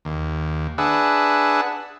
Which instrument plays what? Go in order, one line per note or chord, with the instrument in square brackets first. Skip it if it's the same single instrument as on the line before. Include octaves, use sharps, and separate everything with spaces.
[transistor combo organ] D#2
D4 G#4 B4 E5 F#5